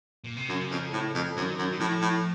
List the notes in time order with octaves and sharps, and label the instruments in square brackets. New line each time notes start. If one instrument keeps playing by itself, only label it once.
[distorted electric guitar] A#2
C3
[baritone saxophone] F#2 [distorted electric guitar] C#3
[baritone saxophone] F2
A2
F2
[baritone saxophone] F#2 [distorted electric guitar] D#3
[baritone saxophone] F#2
[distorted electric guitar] D#3
[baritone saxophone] A2 [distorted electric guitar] F3
[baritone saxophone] A2